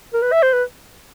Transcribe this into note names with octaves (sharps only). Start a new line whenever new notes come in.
A#4
B4
E5
C5
B4